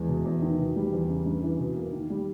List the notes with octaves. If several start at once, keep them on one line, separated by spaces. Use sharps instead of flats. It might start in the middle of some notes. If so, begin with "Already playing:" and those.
Already playing: E2 G#3
B2
E2
D#3
B2
G3
E2
C#3
G2
E3
B2
A#3
D#3
G3